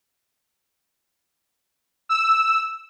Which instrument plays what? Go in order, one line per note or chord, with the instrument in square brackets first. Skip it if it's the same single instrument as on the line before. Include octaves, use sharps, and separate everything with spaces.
[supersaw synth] E6